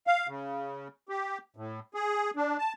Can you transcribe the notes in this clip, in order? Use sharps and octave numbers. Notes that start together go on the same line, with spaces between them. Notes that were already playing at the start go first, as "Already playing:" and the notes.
F5
C#3
G4
A2
G#4
D4
A5